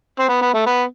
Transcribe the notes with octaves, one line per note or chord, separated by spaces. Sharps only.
C4
B3
B3
A3
B3